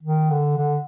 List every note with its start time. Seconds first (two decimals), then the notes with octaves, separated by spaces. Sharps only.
0.03 D#3
0.31 D3
0.57 D3